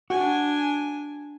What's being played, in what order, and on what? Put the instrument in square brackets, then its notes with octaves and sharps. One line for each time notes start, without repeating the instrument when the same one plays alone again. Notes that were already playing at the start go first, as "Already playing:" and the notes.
[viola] D4 G#5 [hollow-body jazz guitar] F#4